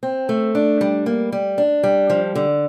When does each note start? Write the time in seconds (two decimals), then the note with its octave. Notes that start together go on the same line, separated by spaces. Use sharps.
0.03 C4
0.29 A3
0.55 D4
0.81 G3
1.06 A#3
1.32 G3
1.58 D4
1.83 G3
2.10 F3
2.35 D3